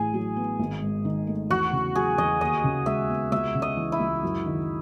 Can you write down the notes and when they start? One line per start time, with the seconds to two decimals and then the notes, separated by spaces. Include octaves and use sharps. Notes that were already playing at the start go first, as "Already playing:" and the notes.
Already playing: A1 A2 G#4
0.14 F#3
0.36 B3
0.59 G#1
0.82 G#2
1.05 D#3
1.27 A3
1.50 E2 F#4
1.73 C#3
1.95 F#3 G#4
2.18 E2 D#5
2.41 D#2 D#5
2.64 C#3
2.86 G#3 E5
3.09 B3
3.32 C#2 E5
3.55 C#3
3.62 D#5
3.77 E3
3.92 E4
4.00 C#2
4.23 F#2
4.46 D#3